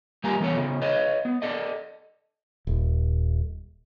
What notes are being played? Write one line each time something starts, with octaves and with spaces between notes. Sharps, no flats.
G3 A#3 G4 A#4 G#5 A#5
E3 B3 A4 C#5
C#3 B3
B4 C#5 D#5
B3
A4 D5 D#5
D#1